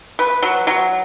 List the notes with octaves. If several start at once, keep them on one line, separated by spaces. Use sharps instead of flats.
B4
F#3
F#3